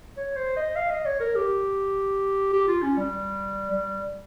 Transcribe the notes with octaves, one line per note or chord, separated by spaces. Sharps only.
C#5
C5
D#5
F5
D#5
C#5
A#4
G4
G4
F4
C#4
G3
G3